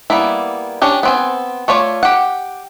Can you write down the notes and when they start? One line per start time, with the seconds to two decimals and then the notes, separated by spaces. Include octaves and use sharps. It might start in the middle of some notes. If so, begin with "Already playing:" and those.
0.10 G3 A#3 B3 E4
0.82 C#4 D4 G4
1.03 B3 C4 G#5
1.68 A3 F4 C#5 D5
2.03 G4 F#5